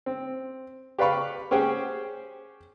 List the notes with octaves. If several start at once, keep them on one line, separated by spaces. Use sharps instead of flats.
C4
G4 B4 D5 F5 B5 C#6
C#4 G4 G#4 C5 F#5 G5